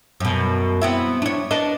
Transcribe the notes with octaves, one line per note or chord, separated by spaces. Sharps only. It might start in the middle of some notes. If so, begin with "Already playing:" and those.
F#2 B2
B3 C4 E4
D4 C#5
D4 B4 D#5